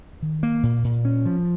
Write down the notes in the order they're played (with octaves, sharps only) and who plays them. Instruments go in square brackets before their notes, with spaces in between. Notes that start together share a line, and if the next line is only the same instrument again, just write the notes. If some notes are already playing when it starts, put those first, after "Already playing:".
[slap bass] D#3
A#3
A#2
A#2
C#4
F3